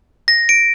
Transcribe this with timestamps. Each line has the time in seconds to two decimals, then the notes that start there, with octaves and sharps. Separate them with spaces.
0.28 A#6
0.49 D7